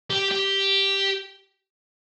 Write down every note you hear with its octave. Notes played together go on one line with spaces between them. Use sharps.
G4
G4